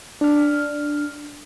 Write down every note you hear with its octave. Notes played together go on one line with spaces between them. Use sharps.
D4 F6